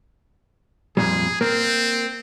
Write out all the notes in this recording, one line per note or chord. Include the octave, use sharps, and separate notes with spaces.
F2 A#2 G3 G#4
A#3 C4